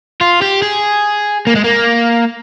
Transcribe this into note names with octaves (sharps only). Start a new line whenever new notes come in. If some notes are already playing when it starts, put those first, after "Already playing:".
F4
G4
G#4
A#3
G#3
A#3